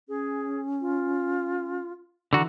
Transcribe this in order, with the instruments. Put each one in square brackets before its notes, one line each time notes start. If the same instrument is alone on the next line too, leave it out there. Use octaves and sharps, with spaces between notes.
[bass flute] C#4 [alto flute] G#4
[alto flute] F4
[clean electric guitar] D3 F#4 [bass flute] E3 [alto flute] A#5